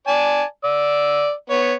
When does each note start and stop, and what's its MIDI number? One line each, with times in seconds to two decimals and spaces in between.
0.07 0.43 74
0.07 0.43 80
0.07 0.43 81
0.64 1.32 74
0.64 1.32 88
1.50 1.73 59
1.50 1.73 73